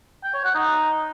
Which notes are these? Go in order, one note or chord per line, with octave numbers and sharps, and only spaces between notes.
G5
C#5
F#5
D#4